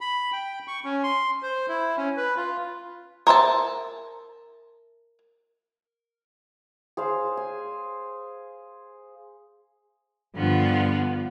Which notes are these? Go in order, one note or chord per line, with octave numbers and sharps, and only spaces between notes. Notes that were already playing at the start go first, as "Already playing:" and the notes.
B5
G5
C#6
C#4
C6
C5
E4
C#4
B4
F4
A#4 C5 E5 A5
G#4 C5 F5
G#5
G2 D3 F3 B3 F4